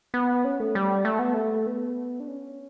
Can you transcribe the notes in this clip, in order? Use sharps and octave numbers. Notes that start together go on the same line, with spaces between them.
B3
C#4
A3
G3
A3
B3
A3
B3
D4
C#4